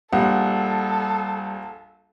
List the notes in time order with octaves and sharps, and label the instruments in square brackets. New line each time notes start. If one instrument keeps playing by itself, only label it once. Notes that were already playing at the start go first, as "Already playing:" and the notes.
[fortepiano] A#1 [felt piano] G3 [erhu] A4 [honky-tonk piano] F#5